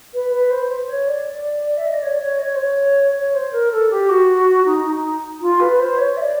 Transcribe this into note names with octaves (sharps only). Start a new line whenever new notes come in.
B4
B4
C5
C5
C#5
D5
D5
E5
D#5
D5
C#5
D5
C#5
D#5
C#5
C5
C#5
C#5
C5
A#4
A4
G4
F#4
D#4
D#4
F4
B4
C5
C#5
E5
D5